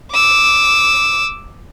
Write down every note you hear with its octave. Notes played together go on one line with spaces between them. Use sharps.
D6 E6